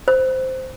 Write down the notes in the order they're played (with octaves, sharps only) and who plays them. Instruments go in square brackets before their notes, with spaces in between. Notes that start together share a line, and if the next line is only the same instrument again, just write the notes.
[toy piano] C5